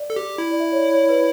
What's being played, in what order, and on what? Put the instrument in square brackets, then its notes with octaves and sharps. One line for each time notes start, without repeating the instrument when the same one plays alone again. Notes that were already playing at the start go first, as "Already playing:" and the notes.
Already playing: [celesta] D5
[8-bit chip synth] A4
G4
E4
[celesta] D5
E5
C#5
D5
C#5
B4